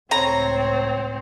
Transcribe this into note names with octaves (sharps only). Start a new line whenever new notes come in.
C#2 A2 C4 C#5 A#5